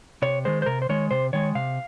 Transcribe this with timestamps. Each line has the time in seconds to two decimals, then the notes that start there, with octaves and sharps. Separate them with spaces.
0.22 C3 C#5
0.45 D#3 G#3 C5
0.62 C5
0.66 C3 A#4
0.82 C5
0.89 D#3 G#3 C#5
1.11 C3 C5
1.33 D#3 G#3 C#5
1.55 C3 F5